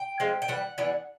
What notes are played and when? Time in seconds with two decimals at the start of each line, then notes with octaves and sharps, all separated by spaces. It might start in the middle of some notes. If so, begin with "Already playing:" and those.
Already playing: G5
0.20 F3 G#3 C4
0.42 G5
0.48 E3 G3 F#5
0.78 E3 G3 B3 D4